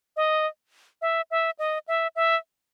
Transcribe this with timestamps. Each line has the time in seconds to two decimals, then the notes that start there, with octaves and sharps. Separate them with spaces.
0.17 D#5
1.02 E5
1.31 E5
1.59 D#5
1.88 E5
2.16 E5